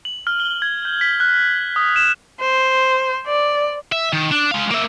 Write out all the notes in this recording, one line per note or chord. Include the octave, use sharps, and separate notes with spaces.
F#7
F6
G7
G#6
G6
B6
F#6
D#6
E7
C5
D5
E5
D#3
D4
G#3 F5
A#3 E5